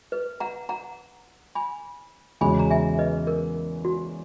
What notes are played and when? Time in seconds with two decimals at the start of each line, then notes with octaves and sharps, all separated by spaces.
0.12 B4
0.40 F#5 A#5
0.69 F#5 A#5
1.55 G#5 B5
2.41 E2 C#3 G#3 C#4 F#4 G#5 B5
2.59 A#5
2.70 E5 G#5
2.99 B4 D#5
3.27 A#4
3.85 F#4